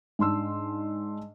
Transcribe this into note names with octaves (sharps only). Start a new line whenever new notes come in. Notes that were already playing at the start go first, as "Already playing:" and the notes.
G#2 D4 C6 E6